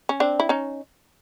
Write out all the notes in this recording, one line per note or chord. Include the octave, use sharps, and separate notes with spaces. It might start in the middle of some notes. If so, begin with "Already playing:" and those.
C#4
C4 D4
E4
C#4 D#4